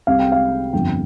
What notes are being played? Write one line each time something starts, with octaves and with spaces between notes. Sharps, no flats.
C2 C3 G3 F5
G5
F5
G1 F2 F3 G5